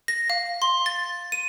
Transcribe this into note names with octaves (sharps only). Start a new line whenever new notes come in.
A#6
F5
C6
A6
D#7